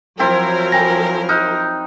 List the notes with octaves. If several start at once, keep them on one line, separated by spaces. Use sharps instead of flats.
F3 F#3 C4 E4 A#4
G5 G#5 A#6
D#4 F6 F#6